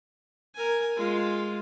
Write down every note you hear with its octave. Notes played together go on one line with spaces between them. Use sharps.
A#4 G#5
G#3 F4